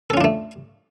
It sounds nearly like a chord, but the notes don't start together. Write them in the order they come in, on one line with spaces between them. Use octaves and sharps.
A4 C#4 F4 D4 A3